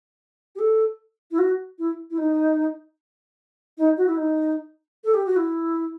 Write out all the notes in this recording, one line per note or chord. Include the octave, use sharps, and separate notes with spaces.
G4
A4
E4
F#4
E4
E4
D#4
D#4
F#4
E4
D#4
A4
G4
F#4
E4